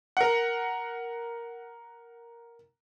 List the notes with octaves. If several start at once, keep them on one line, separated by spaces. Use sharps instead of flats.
A#4 F#5